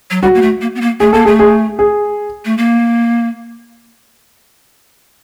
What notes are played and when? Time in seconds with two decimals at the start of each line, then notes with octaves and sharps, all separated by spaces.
0.11 F#3
0.22 G3 F#4
0.35 A#3
0.42 A3
0.61 A#3
0.75 B3
0.81 A#3
1.00 A3 G#4
1.13 A#3 A4
1.25 A3 G#4
1.39 G#4
1.79 G#4
2.45 A3
2.58 A#3